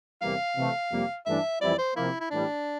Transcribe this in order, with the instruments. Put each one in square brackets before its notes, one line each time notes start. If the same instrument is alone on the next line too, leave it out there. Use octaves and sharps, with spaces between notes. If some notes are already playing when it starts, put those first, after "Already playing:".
[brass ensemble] E2 C3 E3 G3 A#3 [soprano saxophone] F5
[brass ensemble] C3 E3 A3
F2 C3 G3 A#3
[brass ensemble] G2 E3 A3 D4 [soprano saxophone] E5
[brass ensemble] F2 E3 G3 C4 E4 [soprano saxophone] D5
[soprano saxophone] C5
[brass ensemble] C3 F3 A#3 [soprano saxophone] E4
[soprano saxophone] E4
[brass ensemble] A2 E3 G3 [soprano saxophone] D4